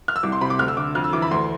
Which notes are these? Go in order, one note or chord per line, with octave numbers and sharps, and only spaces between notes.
F6
E6
C2 D6
C6
C3 B5
D6
D2 F6
E6
D3 D6
F2 F6
E6
E3 D6
B5
D2 C6